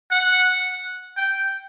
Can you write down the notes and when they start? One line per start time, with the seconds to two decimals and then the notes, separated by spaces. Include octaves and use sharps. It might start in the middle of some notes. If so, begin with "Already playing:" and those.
0.11 F#5
1.17 G5